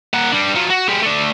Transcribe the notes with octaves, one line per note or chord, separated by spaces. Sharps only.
A#3 F#5
G3 D4
F#3 F4
F#4
G#3 G4
A3 D4